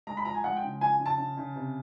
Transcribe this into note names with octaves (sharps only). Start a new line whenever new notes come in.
G#3 A#5
B5
F3 A#5
G#5
G#3 F#5
G5
C#3
F3 G#5
C#3
A5
C#3
C#3
C3